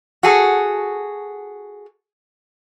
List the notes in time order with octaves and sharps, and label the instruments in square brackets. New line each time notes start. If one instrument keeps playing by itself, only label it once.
[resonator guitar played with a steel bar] F#4 G#4 A4